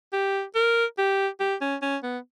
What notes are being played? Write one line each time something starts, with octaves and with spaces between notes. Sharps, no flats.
G4
A#4
G4
G4
C#4
C#4
B3